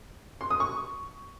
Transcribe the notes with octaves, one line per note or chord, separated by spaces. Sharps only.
C6
D#6
C#6